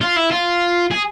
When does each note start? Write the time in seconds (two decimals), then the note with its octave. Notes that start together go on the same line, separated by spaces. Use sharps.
0.01 F4
0.16 E4
0.31 F4
0.91 G#4